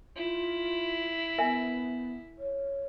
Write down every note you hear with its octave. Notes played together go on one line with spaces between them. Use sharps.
E4 F4
B3 A#4 E5 G#5
C#5